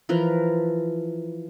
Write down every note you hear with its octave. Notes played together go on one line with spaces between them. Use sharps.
E3 F3 A#4 B4